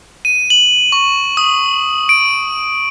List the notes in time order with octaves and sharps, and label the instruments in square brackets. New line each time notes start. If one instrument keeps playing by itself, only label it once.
[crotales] D#7
F#7
C#6
D#6
D7